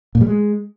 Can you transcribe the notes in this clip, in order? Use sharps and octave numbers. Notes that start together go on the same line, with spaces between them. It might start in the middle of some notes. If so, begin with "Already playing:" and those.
A#2
G3
G#3